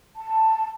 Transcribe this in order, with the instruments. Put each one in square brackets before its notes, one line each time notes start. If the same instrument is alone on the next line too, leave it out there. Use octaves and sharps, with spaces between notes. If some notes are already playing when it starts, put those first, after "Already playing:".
[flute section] A5